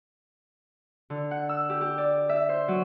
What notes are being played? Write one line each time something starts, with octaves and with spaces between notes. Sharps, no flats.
D3
F#5
E6
G4
G4
D5
E5
C5
F#3